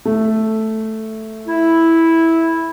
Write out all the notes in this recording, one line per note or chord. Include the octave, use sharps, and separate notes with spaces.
A3
E4